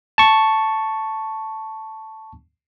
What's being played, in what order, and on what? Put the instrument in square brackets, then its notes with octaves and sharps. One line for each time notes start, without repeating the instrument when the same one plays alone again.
[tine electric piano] A5 C#6